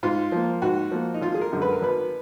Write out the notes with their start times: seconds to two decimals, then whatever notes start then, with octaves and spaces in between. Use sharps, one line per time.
0.03 G#2 F4
0.32 F3 A#3
0.62 G#2 F#4
0.91 F3 A#3
1.14 D#4
1.22 G#1 F4
1.34 G#4
1.41 A#4
1.52 F#2 D3 G#3
1.62 B4
1.72 A#4
1.82 G#1 B4